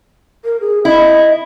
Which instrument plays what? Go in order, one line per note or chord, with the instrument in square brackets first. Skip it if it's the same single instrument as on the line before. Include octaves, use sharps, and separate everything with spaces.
[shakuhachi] A#4
G#4
[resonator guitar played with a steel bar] E4 [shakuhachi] D#5